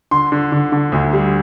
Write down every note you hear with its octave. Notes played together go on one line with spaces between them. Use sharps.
D3 C6
D3
D3
D3
D2
G3